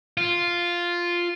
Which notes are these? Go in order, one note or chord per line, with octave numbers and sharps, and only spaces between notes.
F4